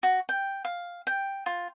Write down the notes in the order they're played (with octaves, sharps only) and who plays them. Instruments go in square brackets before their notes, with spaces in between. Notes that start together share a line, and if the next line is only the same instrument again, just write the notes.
[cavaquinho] F#4
G5
F5
G5
F4